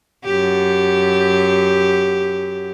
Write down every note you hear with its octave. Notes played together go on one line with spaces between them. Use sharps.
F#2 G4